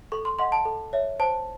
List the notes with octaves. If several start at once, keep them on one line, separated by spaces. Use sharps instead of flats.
A4 C#6
C6
D#5 F#5 C6
A5
A4
C#5 E5
C5 A5